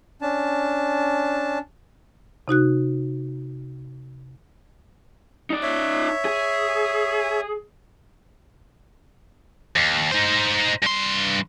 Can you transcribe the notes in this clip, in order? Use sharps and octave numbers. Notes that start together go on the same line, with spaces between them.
C#4 D4 A5
C3 D#4 F#4 F#6
D#4 D5
C#5 E5
G#4
D#2
D#4 C5
G2 C6